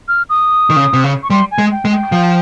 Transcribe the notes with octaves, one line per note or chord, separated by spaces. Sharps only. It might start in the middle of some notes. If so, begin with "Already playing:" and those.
F6
D#6
D#3
C#3
C3
C#3
C#6
G3 C6
G#5
G#3
G5
G#3
G5
F3